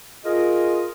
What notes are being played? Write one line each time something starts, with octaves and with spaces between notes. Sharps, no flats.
F4 G#4 A#4 D#5